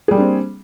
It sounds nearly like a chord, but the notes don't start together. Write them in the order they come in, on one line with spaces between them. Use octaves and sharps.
G#4 G3 A#3 D4 C4